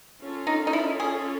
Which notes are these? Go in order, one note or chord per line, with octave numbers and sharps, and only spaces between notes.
C#4 F4 A4
D#4
D#4
E4
G#4